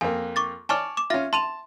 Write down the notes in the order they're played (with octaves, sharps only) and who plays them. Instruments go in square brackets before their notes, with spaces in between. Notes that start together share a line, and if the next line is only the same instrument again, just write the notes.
[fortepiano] F2 A#3 [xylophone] G#5
[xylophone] C#6 D6 A6
[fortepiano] C#5 D5 A5 [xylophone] G#5 C#6 F6
[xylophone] D6 E7
[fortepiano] C#4 F4 [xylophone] E5 A6 A#6
[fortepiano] A5 [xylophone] C6 D#7 F7